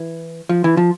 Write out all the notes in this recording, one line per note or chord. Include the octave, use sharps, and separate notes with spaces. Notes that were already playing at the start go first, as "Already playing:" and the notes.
Already playing: E3
F3
E3
F3